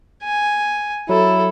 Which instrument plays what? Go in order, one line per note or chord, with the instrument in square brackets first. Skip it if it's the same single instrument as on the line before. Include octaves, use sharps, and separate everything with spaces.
[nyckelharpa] G#5
[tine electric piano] F#3 [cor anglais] E4 [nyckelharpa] A4